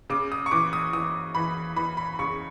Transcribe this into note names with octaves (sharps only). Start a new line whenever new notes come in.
C#3 D6
D#6
C#6
E3 D6
D#6
E3 D#6
E3 B5
E3 B5
B5
C#3 C#6